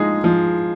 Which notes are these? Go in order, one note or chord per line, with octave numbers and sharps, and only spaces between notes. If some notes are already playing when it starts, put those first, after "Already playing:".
Already playing: F3 G#3 D#4 G#4
F3